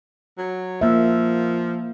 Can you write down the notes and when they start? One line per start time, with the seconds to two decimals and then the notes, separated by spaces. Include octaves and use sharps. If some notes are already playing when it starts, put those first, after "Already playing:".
0.38 F#3
0.81 F3 A#3 E5